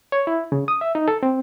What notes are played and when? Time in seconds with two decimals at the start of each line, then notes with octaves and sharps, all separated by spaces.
0.12 C#5
0.27 E4
0.52 C#3
0.68 D#6
0.81 E5
0.95 D#4
1.08 A4
1.23 C4